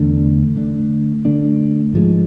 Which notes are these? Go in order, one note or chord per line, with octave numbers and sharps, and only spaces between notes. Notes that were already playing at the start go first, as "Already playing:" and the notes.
Already playing: E2 D3 A3 D4
D3 A3 D4
D3 A3 D4
G#2 F3 G#3